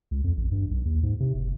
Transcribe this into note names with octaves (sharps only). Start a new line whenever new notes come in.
C#2
F2
A1
G2
B1
D#2
G#2
C3
F#1